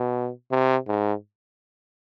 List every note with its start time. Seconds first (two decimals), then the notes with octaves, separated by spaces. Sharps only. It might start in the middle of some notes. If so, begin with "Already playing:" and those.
Already playing: B2
0.51 C3
0.88 G#2